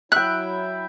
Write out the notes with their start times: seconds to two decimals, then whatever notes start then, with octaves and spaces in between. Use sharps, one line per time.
0.12 F#3 E4 E5 G5 F#6